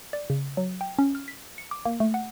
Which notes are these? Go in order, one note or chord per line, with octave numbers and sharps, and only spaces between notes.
D5
C#3
F#3
G5
C#4
F6
B6
C#7
D6
A#3
A3
F#5